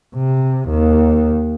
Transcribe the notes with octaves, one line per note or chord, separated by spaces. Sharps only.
C3
D#2